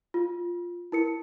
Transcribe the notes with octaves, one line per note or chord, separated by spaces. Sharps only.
F4
E4 A#4 C#7